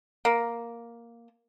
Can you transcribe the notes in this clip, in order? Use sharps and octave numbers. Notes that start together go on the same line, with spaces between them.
A#3